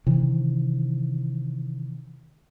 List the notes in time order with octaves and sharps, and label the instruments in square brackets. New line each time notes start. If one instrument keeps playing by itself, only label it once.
[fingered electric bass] C3 D#3 E3